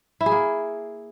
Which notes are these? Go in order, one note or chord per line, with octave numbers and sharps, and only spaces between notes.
E4
G#4
A#3